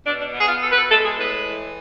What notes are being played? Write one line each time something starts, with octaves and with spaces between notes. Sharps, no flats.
B2 D4
D4
B3
G#4
F4
B2 A4
B4
A4
G#3 A4
G#4
A2 B4
E3